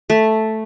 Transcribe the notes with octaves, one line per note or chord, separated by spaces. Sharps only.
A3